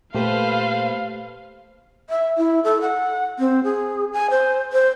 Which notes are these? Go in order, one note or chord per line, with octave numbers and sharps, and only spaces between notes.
A#2 A3 G4 A4 B4 C5 F5
E5
E4
A4
F#5
C4
G#4
G#5
C5
C5